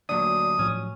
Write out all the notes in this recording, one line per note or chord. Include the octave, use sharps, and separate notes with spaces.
D2 A#2 F#3 D4 D#6
A2 F3 F#3 C#4